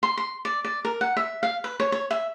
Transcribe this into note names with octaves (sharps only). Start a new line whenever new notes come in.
C6
C6
D5
D5
A#4
F#5
E5
F5
B4
C#5
C#5
E5